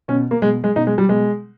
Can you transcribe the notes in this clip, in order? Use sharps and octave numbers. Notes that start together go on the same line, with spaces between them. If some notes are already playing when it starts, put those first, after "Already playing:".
B2 C#4
A#3
B2 G#3
G#3
B2 D#4
G#3
G3
B2 G#3